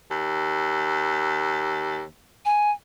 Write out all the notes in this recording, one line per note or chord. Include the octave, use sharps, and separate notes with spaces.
D#2
G#5